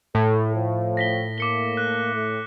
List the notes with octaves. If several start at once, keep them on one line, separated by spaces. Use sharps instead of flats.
A2 A4
F3
A#6 B6 G7
A#3 D6 C#7 G7
F#6
A3